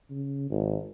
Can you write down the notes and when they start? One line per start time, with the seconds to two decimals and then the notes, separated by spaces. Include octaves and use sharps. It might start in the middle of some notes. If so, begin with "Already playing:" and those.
0.10 C#3
0.51 G#1